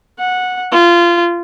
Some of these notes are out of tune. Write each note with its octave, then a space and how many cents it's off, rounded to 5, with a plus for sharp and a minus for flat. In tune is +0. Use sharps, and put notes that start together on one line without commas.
F#5 -15
F4 -20